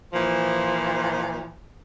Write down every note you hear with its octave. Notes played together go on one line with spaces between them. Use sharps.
A#2 E3 F3